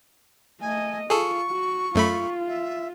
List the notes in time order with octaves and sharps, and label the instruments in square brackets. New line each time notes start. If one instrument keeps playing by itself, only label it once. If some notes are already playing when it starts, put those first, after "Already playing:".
[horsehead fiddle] A3 D#5 [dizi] G#5
[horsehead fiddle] F4 [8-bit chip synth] G#4 A4 [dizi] C#6
[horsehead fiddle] F#4
[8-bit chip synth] F#2 A3 B5 [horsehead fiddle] F4
[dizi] E5